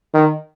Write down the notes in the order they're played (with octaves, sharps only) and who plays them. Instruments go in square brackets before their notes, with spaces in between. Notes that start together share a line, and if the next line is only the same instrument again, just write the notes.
[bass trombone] D#3